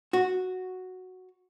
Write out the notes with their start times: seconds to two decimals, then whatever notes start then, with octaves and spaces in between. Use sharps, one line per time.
0.13 F#4